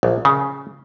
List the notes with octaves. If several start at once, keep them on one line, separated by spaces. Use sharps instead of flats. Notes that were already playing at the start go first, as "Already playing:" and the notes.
A#1
C#3